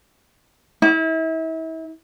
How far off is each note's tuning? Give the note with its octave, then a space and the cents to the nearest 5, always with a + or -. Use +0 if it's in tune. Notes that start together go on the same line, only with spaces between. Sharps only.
E4 -35